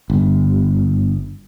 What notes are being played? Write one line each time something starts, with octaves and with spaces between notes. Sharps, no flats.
G1